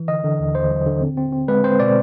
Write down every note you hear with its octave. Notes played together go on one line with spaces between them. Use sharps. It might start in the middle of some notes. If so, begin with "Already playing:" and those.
Already playing: E3
D3 D#5
D3
D#2
D#2 C5
F#3
D3
C4
C4
C4
G#3 B4
C4 C5
B2 D5